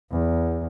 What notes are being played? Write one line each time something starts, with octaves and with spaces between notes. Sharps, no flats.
E2